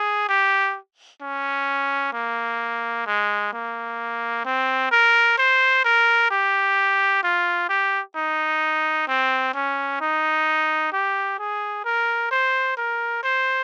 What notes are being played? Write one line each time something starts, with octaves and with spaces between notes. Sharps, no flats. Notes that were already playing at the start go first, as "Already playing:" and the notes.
Already playing: G#4
G4
C#4
A#3
G#3
A#3
C4
A#4
C5
A#4
G4
F4
G4
D#4
C4
C#4
D#4
G4
G#4
A#4
C5
A#4
C5